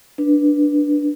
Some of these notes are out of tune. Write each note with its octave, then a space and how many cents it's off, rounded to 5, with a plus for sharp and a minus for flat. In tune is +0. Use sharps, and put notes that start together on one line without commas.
D4 +0 B4 -15